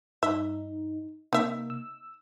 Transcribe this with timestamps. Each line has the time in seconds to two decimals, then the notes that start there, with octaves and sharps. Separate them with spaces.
0.23 G2 D#4 E5
1.33 C3 A#3 D#4 E5
1.70 E6